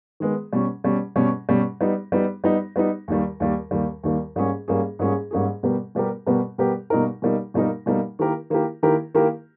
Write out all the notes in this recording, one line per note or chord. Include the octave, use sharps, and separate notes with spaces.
D#3 G#3 B3
B2 G3 C#4
B2 G3 C#4
B2 G3 C#4
B2 G3 C#4
G3 B3 D#4
G3 B3 D#4
G3 B3 D#4
G3 B3 D#4
D#2 D#3 G3
D#2 D#3 G3
D#2 D#3 G3
D#2 D#3 G3
G#2 G3 A#3 C#4 G#4
G#2 G3 A#3 C#4 G#4
G#2 G3 A#3 C#4 G#4
G#2 G3 A#3 C#4 G#4
B2 G3 B3 G4 A#4
B2 G3 B3 G4 A#4
B2 G3 B3 G4 A#4
B2 G3 B3 G4 A#4
B2 G3 A#3 D#4 A#4
B2 G3 A#3 D#4 A#4
B2 G3 A#3 D#4 A#4
B2 G3 A#3 D#4 A#4
D#3 A#3 E4 G4 A#4
D#3 A#3 E4 G4 A#4
D#3 A#3 E4 G4 A#4
D#3 A#3 E4 G4 A#4